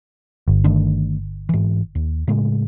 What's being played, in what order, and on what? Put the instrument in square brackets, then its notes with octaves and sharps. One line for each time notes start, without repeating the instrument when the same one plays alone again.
[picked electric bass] G1
[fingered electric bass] D#3 A3 D4
G#2 E3
D#2
A2 C#3 G#3